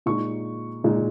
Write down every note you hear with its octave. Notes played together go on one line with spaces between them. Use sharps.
A#2 G#3 D#4 C#6
A#2 G#3 D#4